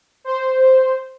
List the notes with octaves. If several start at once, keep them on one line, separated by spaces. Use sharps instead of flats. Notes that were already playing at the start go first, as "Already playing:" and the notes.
C5